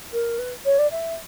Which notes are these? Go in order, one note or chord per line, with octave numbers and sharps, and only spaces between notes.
A#4
B4
C#5
D5
E5